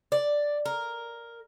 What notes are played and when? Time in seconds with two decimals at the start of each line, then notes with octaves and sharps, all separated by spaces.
0.12 D5
0.66 A#4